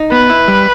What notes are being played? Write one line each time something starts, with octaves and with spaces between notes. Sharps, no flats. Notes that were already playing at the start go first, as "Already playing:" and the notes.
Already playing: D#4
B3 B4
E4
G3